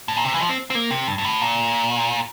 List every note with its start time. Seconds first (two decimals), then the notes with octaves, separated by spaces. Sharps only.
0.08 A2
0.16 A#2
0.25 C3
0.33 E3
0.41 F3
0.49 C4
0.70 C4
0.75 A#3
0.91 C3
1.07 G2
1.18 G2
1.24 A2
1.41 A#2